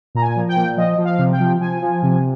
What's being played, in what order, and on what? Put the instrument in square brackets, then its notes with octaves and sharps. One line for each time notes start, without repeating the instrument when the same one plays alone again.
[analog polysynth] A#2 A#5
G#5
F3
G5
A#2
F3 D#5
F3
F5
C3
G5
F3
F3 G#5
F3
C3